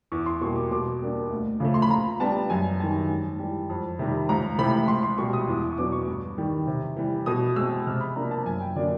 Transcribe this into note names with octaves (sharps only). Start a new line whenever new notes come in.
E2 C#6
C6
B2 G3 A#3 C#6
D6
B2 D6
G3 A#3 D4
D2
C#3 F3 A3
C6
B5
A#2 A#5
G3 B3 D4 A5
F#2 G#5
D#3 G3 A5
G#2
E3 G3
F2
C3 D#3 G3
C#2 A#5
C3 E3 A3 C4 B5
C#2 C6
C6
B2 G3 C#6
D#6
E2
C#6
B2 F#3 B3 D4 D6
C#6
G2
D#3 G3
C3
E3 G3
B2 D#6
G#3 C4 E6
C3 F6
B5
F3 A#3 D4 A#5
A5
F#2 G#5
G5
D3 F#3 A#3 D4 D5